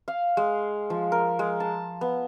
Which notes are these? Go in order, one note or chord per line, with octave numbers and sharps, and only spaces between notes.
F5
G#3
F3
A#4
G#3
A5
B3